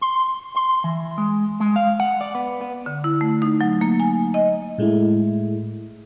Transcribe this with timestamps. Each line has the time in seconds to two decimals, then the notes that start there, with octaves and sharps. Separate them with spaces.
0.01 C6
0.56 C6
0.84 E3
1.18 G#3
1.60 G#3
1.76 F5
2.00 F#5
2.21 D5
2.35 B3
2.61 B3
2.86 D3
3.04 E4
3.21 A3
3.42 D#4
3.61 F#3
3.81 A#3
4.00 G#5
4.34 D#5
4.78 A2 G#3 A3 E4